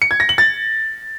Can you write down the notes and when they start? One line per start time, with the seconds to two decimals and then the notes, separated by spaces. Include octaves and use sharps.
0.02 C#7
0.11 G#6
0.20 A#6
0.29 F#7
0.38 A6